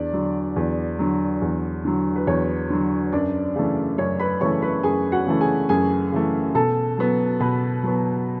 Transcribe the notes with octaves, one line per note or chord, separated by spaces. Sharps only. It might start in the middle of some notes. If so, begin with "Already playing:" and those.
Already playing: E2 D4 D5
D3 F#3
E2
D3 F#3
E2
D3 F#3
B4
E2 C#5
D3 F#3
F#2 D4 D5
C#3 E3 A3
F#2 C#5
B4 B5
C#3 E3 A3 C#5 C#6
B4 B5
F#2 G#4 G#5
F#4 F#5
C#3 E3 A3
G#4 G#5
F#2 G#4 G#5
C#3 E3 A3
B2 A4 A5
F#3 B3
B2 B4 B5
F#3 B3